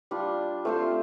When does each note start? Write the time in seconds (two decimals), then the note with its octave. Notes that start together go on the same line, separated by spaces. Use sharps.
0.11 G3 D4 F4
0.65 A3 C4 F4 C5